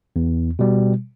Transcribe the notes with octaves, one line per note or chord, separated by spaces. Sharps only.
E2
B2 G3